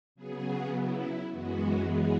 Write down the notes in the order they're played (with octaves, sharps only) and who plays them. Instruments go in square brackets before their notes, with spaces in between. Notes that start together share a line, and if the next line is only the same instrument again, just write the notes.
[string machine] C#3 F#3 B3 G#4
E4
F#2 E3 G#3 B3 F#4
G#4